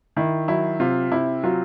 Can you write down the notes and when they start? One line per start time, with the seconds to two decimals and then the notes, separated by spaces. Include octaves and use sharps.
0.17 D#3 E4
0.48 F#3 E4
0.80 C3 F4
1.11 C3 E4
1.44 F#3 F4